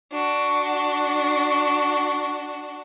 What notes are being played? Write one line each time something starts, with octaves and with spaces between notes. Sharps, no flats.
D4 F#4